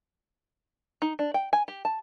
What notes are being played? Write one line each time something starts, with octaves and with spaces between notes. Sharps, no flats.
D#4
D4
G5
G#5
G4
A5